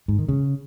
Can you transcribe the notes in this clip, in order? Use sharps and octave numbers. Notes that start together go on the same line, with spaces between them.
G#2
D#3
C#3